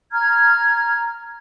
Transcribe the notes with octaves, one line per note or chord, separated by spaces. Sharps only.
A#5 F6 G#6